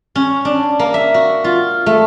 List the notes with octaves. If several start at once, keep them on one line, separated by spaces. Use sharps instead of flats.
C#4
D4
A#3
E5
F#4
F4
A3